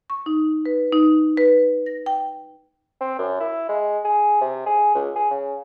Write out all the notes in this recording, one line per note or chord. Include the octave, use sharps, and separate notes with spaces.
C#6
D#4
B4
D#4
B4
A#6
G5
C4
F#2
E4
G#3
G#4
C3
G#4
C#2
G#4
C#3